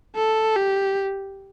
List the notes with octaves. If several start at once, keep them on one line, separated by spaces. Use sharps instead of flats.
A4
G4